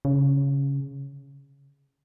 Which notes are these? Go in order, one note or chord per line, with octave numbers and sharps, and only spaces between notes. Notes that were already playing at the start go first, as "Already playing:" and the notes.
C#3